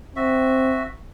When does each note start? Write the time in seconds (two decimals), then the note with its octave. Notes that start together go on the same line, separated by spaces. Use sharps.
0.16 C4 F#4 E5